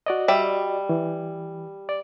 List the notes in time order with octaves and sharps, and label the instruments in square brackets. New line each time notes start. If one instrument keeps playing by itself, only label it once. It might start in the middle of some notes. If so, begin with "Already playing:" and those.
[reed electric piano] F#4 D5 D#5
[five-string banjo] G3 E5
[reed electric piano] E3
D5